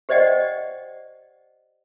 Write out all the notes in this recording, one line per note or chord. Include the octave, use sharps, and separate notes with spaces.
G4 C5 D5 D#5 F#5 G5